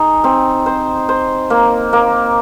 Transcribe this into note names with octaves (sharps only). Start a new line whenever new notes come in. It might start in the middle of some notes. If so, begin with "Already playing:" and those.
Already playing: D#4 G#4
C4
C5
C5
A#3
A#3